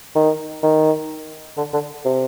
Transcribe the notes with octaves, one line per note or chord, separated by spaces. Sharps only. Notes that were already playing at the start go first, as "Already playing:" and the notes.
D#3
D#3
D3
D3
C3